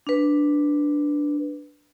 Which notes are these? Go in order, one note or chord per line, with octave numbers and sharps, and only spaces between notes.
D4 B4